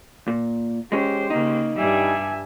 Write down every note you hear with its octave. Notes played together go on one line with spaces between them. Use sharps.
A#2
G#3 C#4 G4 C5
C#3 A#3 D#4
G2 G3 E5 G#5